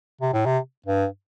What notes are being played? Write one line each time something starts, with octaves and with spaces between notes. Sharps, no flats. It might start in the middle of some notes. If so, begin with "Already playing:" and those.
C3
A2
C3
G2